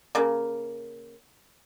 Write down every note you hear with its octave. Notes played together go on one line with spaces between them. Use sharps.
C#3 A#3